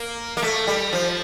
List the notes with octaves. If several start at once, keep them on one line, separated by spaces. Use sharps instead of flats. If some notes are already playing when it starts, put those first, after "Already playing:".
Already playing: A#3
A#3
A3
G3
F3